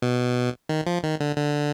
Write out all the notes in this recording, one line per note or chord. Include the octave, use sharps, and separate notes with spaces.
B2
D#3
F3
D#3
D3
D3